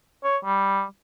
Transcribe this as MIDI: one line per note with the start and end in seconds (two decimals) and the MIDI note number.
0.24 0.37 73
0.45 0.84 55